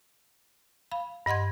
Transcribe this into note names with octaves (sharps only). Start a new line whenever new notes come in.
F5 B5
G2 D#5 F#5 C6 G#6